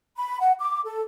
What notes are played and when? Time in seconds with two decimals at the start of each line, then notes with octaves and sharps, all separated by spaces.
0.16 B5
0.40 F#5
0.59 D6
0.85 A4